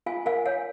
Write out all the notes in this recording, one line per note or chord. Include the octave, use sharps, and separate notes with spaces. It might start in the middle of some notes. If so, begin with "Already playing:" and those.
F4 F5 G#5
A#4 F5 G#5
C#5 F5 G#5